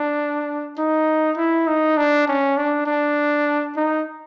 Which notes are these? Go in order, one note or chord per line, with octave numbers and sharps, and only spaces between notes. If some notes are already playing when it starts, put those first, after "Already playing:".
Already playing: D4
D#4
E4
D#4
D4
C#4
D4
D4
D#4